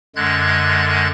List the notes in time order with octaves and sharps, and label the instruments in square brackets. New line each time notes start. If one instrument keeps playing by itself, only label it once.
[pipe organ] F#2 D3 G#3 F#6 G#6 A6